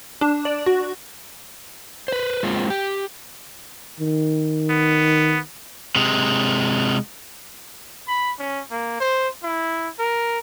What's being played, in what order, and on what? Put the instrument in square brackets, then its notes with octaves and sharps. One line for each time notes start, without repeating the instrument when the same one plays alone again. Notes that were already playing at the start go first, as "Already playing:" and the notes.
[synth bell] D4
D5
F#4
[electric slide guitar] B4 C5
G#3 A#3 C4 F4
G4
[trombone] D#3
[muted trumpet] B3
[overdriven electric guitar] C3 G#3
[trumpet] B5
C#4
A#3
C5
E4
A#4